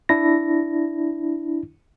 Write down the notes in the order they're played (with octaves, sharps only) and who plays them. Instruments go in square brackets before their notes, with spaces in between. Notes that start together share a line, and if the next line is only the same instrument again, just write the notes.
[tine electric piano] D4 E4 A#6